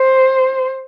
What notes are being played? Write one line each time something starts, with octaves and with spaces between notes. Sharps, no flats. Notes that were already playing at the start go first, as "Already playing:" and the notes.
Already playing: C5